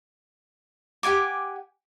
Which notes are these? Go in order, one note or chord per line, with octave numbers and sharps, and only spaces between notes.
G4 F#5 G#5 D6